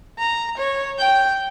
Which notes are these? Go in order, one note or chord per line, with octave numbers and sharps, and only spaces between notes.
A#5
C#5
G5